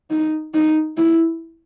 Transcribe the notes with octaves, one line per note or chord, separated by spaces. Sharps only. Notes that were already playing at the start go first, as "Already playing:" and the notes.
D#4
D#4
E4